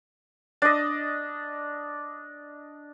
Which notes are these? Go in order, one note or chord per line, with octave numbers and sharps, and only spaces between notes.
D4 D#5